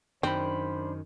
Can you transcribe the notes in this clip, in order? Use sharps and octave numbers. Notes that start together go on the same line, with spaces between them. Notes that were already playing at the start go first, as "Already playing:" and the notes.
F#2 D#3 C4 D4 C5 B5